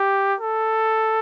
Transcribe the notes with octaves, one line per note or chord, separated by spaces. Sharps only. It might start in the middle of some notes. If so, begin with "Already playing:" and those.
Already playing: G4
A4